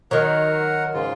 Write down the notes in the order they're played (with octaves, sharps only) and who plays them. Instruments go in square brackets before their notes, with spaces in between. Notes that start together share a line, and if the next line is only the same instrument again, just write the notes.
[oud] D#3 F#3 [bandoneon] A#4 F#5
[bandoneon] G#2 C#3 F4